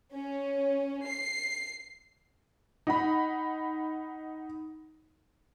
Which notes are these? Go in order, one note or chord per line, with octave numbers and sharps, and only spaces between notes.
C#4
C7
D#4 F#5 B5